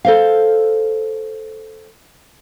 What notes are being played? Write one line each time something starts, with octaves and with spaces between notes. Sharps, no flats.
A4 C5 F5